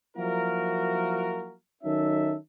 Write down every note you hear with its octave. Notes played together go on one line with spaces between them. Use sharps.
F3 F#3 A#3 E4 F#4 A#4
D#3 F#3 C#4 D#4 A4 E5